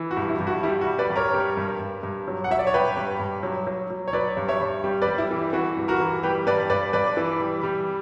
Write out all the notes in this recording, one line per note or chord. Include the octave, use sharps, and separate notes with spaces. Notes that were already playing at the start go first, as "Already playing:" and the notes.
Already playing: E3
F#4
G2
E4
G2
F#4
G3 E4
F#4
G3
B4 D5
G2
A#4 C#5
G3
G2
G2
G2
F#3
F#5
F#3 E5
D5
C#5
G2 G4 B4
G2
G2
F#3
F#3
F#3
C#5
F#3 B4 D5
G2
C#5 E5
G2
G3
B4 D5
G3
E4
E3
E3 F#4
G2
F#4 A#4
E3
G3 G4 B4
G2 B4 D5
G2 B4 D5
G2 B4 D5
E3
G3
G3